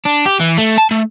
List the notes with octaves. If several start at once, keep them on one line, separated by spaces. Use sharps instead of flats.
D4
G4
E3
A3
A5
A3